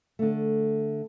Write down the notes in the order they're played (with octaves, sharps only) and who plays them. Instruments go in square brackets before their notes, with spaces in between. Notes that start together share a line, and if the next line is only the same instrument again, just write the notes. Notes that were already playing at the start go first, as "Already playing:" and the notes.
[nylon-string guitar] D3 A3